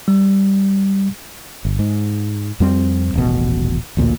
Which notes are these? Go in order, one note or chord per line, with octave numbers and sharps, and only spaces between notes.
G3
G1
G#2
F2 G3 C4
D#1 A1 B2
A1 D2 A#2 A#3